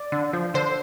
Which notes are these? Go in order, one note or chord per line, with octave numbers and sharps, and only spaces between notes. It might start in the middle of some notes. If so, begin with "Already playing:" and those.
Already playing: D5
D3
F3
D3 C5